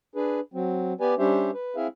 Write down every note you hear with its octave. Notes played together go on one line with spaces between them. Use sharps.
D4 G#4 B4
F#3 C4
B3 G4 B4 D5 G#5
G3 C#4 D4 G4 C5 E5
B4
C4 E4 G#4 E5 F5